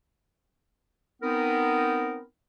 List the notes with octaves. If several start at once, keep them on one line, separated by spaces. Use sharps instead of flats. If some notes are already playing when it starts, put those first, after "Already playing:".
B3 C4 D#4 A#4